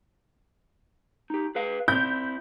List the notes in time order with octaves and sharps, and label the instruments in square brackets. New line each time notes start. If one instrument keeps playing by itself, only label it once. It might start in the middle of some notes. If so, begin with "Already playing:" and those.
[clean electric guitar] D#4 G4
G#4 B4 F5
[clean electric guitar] C4 E4 [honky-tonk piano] G6